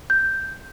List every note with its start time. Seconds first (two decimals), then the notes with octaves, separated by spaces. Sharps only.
0.10 G6